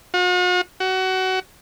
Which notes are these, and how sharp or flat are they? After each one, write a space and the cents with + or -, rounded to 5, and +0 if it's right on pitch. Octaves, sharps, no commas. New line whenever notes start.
F#4 -45
F#4 +25